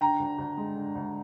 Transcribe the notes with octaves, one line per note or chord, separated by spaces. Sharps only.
D3 G5 A#5
D2
D2
G#3
D3
D2